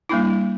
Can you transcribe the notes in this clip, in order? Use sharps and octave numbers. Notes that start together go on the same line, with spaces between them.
G3 A#3 D4 E4